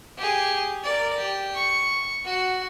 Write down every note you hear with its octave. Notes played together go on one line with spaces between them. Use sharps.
G4 G#4
A#4 D5
G4
C#6
F#4